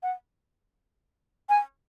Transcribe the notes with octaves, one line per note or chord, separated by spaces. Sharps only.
F#5
G#5